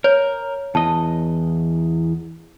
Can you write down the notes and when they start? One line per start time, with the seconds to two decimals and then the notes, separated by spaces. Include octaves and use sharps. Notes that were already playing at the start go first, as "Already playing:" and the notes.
0.04 A#4 C#5
0.75 E2 D#5 A5